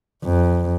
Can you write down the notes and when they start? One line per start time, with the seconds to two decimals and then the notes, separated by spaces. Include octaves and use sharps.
0.24 F2